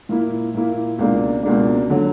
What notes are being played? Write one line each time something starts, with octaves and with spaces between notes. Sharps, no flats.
A#2 A#3 E4
A#2 A#3 E4
C#2 B2 A#3 D4
C#2 B2 A#3 D4
D3 F#3